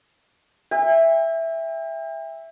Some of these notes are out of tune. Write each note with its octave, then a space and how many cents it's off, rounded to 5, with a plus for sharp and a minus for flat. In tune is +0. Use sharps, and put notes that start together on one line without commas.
E5 +0 G5 +45